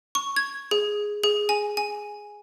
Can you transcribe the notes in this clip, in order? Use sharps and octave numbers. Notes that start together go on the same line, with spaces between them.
C#6
G#6
G#4
G#4
G#5
G#5